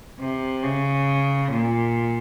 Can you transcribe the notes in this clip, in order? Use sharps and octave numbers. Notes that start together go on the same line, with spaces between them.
C3
C#3
A#2